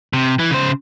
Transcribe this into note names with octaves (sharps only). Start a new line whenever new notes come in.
C3
E3
C#3 C5